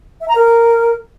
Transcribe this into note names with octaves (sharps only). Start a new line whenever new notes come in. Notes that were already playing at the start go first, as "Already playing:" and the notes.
E5
A#5
A#4